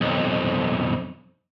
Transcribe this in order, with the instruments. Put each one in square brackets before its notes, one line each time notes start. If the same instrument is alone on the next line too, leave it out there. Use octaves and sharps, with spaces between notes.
[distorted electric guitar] B1 F2